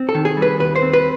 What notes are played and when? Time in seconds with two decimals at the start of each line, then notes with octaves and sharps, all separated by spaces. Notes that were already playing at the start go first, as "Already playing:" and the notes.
Already playing: C4
0.09 A4
0.15 D#3
0.25 G#4
0.37 G3
0.42 B4
0.60 D#2 B4
0.76 C5
0.82 C4
0.93 B4